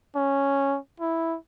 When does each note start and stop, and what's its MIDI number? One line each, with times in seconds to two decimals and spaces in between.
0.16 0.77 61
1.00 1.37 64